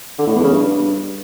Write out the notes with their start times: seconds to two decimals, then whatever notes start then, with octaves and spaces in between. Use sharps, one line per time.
0.19 D3
0.27 A2
0.36 E2
0.44 C#3
0.52 G2